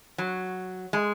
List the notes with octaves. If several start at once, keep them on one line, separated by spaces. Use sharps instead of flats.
F#3
G#3